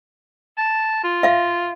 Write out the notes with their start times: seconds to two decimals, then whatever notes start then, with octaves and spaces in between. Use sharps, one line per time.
0.58 A5
1.04 F4
1.23 E5 F5